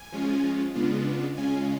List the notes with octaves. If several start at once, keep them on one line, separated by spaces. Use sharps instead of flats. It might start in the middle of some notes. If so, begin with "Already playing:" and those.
Already playing: G#5
F3 G#3 C#4 F4
C#3 G#3 B3 D4 F4
C#3 G#3 C#4 F4 G#5